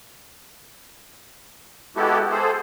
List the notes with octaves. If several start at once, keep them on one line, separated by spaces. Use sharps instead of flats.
G#3 B3 E4 F#4 G4 A4
G#4 A4 C5